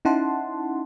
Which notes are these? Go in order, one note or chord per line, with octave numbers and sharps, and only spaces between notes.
C#4 D#4 E4 F#5 A5 C6